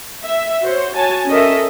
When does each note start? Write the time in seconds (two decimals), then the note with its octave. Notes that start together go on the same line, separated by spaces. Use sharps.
0.23 E5
0.62 F#4 C5 C#5
0.94 F#4 C#5 G#5 A5
1.27 C#4 A4 A#4 D#5 E5